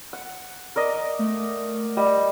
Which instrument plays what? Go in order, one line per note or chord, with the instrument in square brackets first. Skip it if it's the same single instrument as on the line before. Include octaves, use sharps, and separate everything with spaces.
[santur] F#5
A#4 D5 D#5
[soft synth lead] A3
[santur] G3 [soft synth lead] D#5